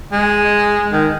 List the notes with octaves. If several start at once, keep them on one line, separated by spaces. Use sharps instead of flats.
G#3
D#3